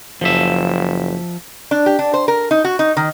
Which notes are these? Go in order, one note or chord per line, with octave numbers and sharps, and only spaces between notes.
F#1 F3 E5
D4
G4
D4
C5
A#4
D#4
F#4
D#4
D#3